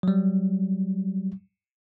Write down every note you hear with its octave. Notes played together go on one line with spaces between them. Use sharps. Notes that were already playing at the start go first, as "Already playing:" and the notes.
F#3 G3